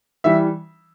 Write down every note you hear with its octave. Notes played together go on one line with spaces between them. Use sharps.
E3 G3 E5